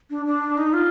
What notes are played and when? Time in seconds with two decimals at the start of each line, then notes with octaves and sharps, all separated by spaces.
0.10 D4
0.26 D4
0.57 D#4
0.73 F4